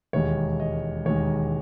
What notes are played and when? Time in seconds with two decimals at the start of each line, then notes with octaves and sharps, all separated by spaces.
0.13 E1 D#2 D#3 G#3 C#5
0.60 D#5
1.05 E1 D#2 D#3 G#3 C#5